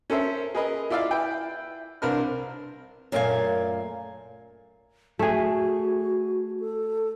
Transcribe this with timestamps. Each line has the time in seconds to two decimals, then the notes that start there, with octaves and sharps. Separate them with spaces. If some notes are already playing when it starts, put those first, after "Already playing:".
0.10 C#4 A4 A#4 C5 E5
0.55 G#4 A#4 B4 D#5
0.90 E4 F4 D5 E5 F5
1.11 E4 B4 G5
2.02 C2 C4 D4 A#4 B4 F6
3.12 F#2 A#2 A3 G#4 F5 G#5
5.19 A3 F#4 G#4
6.60 A4